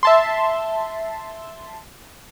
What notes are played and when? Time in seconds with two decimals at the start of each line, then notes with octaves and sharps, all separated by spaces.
0.03 E5 A5 C6